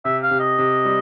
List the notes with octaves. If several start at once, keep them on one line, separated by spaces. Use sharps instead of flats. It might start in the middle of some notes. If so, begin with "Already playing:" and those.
C3 E5
F5
C3
D#5
C3
G3